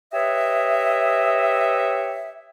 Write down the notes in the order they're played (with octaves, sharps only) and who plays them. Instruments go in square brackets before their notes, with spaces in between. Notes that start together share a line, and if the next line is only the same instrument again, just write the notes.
[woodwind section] G4 B4 C#5 D#5 E5